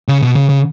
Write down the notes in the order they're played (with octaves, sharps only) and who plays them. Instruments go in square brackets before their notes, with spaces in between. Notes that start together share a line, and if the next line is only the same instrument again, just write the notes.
[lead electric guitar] C#3
B2
C#3
C#3